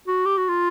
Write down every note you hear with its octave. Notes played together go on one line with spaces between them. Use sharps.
F#4
G4
F#4
F4